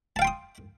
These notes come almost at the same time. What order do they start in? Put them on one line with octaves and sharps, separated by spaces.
A5 F5 G5 C6 D#6